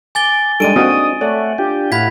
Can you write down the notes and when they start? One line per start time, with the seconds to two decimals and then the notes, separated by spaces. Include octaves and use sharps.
0.15 G#5 D6 A6 G7
0.60 G3 G#3 D4 D#4 A4 D7 D#7
0.76 A#3 C4 F#4 D#6
1.21 A3 C#5 D5 F#5
1.58 D4 F4 G4 G5
1.92 A2 E4 F5 F#5 B5 G#6 B6